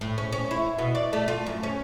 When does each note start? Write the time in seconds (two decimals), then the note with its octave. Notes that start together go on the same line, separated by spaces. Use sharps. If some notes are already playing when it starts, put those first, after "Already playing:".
0.01 A2
0.18 C#4
0.32 C#4
0.51 E4
0.78 B2
0.95 D5
1.13 A3
1.28 F4
1.47 F#2
1.63 C#4